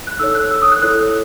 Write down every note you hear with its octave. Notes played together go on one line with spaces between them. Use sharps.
F#6
D#4 A4 C#5 E6
F#6
E6
D#6
F#6
E4 A4 C#5 F#6